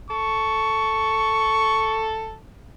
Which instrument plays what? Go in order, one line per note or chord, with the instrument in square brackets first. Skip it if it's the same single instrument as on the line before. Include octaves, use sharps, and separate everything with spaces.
[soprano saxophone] A4 [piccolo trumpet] C#6